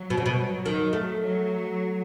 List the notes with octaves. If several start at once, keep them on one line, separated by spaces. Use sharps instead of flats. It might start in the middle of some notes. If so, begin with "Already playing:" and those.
Already playing: F#3
B2
C#3
B2
F#3
D#3
A3
F#3